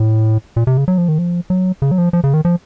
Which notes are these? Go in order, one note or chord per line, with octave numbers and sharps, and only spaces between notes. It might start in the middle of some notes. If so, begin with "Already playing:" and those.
Already playing: A2
A#2
C3
C#3
F#3
F3
D#3
F3
F#3
C#3
F#3
F3
F3
C#3
D#3
F3